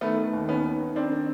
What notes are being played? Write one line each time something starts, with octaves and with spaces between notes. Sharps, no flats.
D#3 A3 B3
D#3
D#2
D#3 B3 C#4
D#3
D#3
D#3 C4 D4
D#3